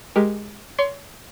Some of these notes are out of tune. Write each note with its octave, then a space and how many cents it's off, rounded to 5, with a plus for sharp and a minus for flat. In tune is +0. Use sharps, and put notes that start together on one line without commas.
G#3 +0 G4 +5 A#4 +10
C#5 +30 C6 +0